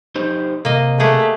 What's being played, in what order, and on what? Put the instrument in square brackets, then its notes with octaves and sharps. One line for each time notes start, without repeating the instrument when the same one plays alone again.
[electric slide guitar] D#4 G4 C5
[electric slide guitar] C3 [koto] A#3 D#5
[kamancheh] A3 [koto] G4 G#4 F#5